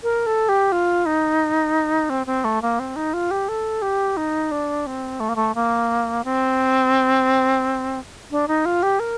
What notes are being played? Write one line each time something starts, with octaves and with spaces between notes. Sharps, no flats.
A#4
A4
G4
F4
D#4
C4
C4
A3
A#3
C4
D#4
F4
G4
A4
G4
D#4
D4
C4
A3
A#3
A3
A#3
C4
D4
D#4
F4
G4
A#4